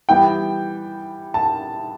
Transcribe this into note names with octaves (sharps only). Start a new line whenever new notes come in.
E3 G3 B3 G5
A5